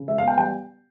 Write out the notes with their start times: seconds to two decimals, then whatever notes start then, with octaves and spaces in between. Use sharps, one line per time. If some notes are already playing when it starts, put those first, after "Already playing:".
Already playing: C#3
0.08 G#3 E5
0.18 F5
0.23 B3
0.28 G5
0.38 G3 G5